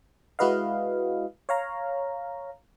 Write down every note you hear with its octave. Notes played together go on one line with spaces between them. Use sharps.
G#3 E4 F#4 B4 D#5 F5
C#5 F5 A#5